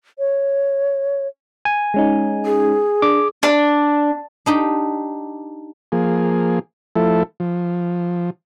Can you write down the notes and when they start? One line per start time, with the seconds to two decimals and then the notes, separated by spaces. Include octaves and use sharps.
0.19 C#5
1.65 G#5
1.94 G#3 C#4 D#4
2.46 G#4
3.02 D4 D6
3.43 D4
4.46 D4 D#4 G4
5.92 F3 A#3 G#4
6.96 F3 A3 E4 A4
7.40 F3